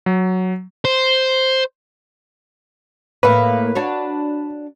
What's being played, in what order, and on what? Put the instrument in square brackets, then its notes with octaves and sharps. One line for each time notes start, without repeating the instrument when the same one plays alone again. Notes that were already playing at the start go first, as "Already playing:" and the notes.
[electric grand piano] F#3
[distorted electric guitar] C5
[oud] A2 A#3 [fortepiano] B4
[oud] D4 F#4 C#5